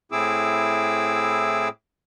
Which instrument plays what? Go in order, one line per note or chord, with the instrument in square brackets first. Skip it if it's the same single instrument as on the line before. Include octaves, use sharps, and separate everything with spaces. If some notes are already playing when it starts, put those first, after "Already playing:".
[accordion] A2 C4 E4 G#4 D6 E6